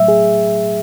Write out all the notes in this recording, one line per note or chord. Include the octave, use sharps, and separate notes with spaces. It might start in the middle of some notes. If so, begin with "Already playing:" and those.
Already playing: A2 F#3 A3 E5
G#4